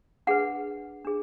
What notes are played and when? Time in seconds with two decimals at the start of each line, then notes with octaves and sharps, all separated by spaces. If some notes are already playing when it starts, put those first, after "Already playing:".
0.27 D4 G#4 B4 F#5
1.05 D4 G#4